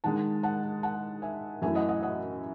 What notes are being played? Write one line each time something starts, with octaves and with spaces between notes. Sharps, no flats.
D#3 G#3 D#4 F#5 A5
F#5 A5
F#5 A5
E5 G#5
F#2 E3 A3 E4 E5 G#5
D#5 F#5
D#5 F#5
D#5 F#5